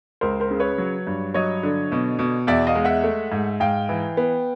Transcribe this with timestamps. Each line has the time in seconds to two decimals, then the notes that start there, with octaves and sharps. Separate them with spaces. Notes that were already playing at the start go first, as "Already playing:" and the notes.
0.21 C#2 A#4 C5
0.40 A#4 C5
0.51 C#3
0.60 B4 C#5
0.78 F#3
1.07 G2
1.34 F#3 C#5 D#5
1.63 D3
1.92 B2
2.19 B2
2.47 E2 D5 E5
2.67 D#5 F5
2.75 G#3
2.85 E5 F#5
3.04 A3
3.32 G#2
3.60 G#2 F5 G5
3.89 E3
4.17 B3